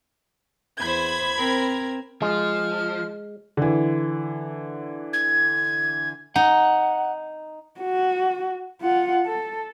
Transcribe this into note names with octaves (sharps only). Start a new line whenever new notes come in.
E2 C5 B5 G#6
C4 A#4
F3 G#3 F6
D3 E3
G#6
D#4 F#5
F#4
F4 F#5
A4